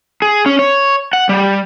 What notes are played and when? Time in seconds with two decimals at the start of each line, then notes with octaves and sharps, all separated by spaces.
0.22 G#4
0.46 C#4
0.59 C#5
1.13 F#5
1.29 G3